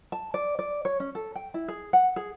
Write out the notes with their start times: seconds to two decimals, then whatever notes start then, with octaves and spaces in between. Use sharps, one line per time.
0.12 A5
0.34 D5
0.59 D5
0.85 C#5
1.00 C#4
1.15 A4
1.35 G5
1.54 E4
1.68 G#4
1.93 F#5
2.16 G#4